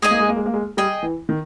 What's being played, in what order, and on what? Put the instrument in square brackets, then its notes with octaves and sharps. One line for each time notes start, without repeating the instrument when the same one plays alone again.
[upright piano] G#3 [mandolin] D#4 G#4 D#5 G#5
[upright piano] A#3
G#3
A#3
G#3
A#3
G#3
[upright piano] G3 [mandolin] G#4 D#5 G5
[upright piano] E3
D#3